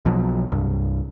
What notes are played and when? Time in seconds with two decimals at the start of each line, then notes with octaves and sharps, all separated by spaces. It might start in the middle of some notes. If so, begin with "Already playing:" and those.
0.05 B1 B2 F3 F#3
0.52 C2 G2